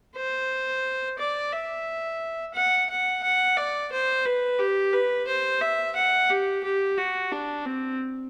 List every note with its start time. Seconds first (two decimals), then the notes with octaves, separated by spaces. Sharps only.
0.16 C5
1.19 D5
1.53 E5
2.54 F#5
2.90 F#5
3.23 F#5
3.57 D5
3.92 C5
4.26 B4
4.59 G4
4.93 B4
5.27 C5
5.61 E5
5.96 F#5
6.30 G4
6.64 G4
6.98 F#4
7.32 D4
7.66 C4